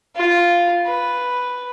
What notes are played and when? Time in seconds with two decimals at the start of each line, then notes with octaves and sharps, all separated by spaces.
0.17 F4
0.87 B4